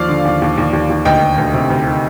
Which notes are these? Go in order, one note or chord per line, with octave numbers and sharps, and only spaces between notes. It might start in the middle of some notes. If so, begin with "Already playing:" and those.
Already playing: D#2 F3 D5 F5
D3
D#2
D#2
D#2
D#2
D#2
D2 D#5 G5
D2
D2
C3
D2
D#3